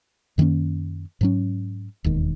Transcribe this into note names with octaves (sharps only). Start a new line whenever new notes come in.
F#2 D#3 A#3 C#4
G#2 F#3 C#4
E1 D#2 D#3